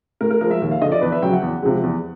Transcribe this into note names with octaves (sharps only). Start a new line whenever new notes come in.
A2 A#4
A#4
F3 G#3 A#4
E5
D#2
F5
D3 F3 D#5
D5
E2 B4
E5
C#3 F#3 G5
F#5
E2
C3 F3 G#3
E2